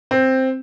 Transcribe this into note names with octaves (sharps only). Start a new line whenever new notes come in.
C4